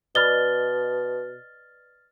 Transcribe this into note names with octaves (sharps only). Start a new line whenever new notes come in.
B2 B4 D5 D#5 F6 A6 G7